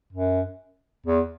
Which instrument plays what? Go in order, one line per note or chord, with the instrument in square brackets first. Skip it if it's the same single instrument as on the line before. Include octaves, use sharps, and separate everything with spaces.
[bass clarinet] F#2
E2